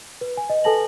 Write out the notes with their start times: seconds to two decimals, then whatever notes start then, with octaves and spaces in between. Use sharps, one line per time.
0.21 B4
0.37 G#5
0.50 D#5
0.64 A4 B4 G#5 A5 A#6 F#7